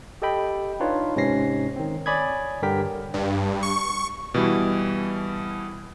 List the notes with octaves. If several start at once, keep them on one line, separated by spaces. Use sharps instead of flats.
G4 A4 D#5 G5 B5
D4 D#4 F4 B4 C#5
G#2 C3 C#4 C#5 A#6 C7
D#3 C4
C#5 D5 G#5 B5 D#6 G#6
G2 D3 G4 A#4 G5 B6
G2
C#6
B2 E3 G3 E4